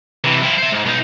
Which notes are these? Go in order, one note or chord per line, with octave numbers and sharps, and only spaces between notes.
C3 E3
F3 E4
C5 E5
G#2
B1 D#4